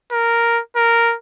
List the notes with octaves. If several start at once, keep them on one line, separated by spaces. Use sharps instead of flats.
A#4
A#4